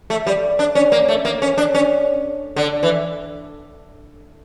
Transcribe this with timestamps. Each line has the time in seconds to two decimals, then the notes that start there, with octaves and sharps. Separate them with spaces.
0.10 A3
0.27 G3
0.59 D4
0.75 C#4
0.92 A#3
1.08 A3
1.25 A#3
1.42 C#4
1.58 D4
1.75 C#4
2.56 D3
2.83 E3